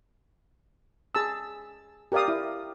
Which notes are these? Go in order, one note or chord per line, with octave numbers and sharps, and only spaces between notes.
G#4 A5 E6
G4 A#4 D5 F5 D#6
E4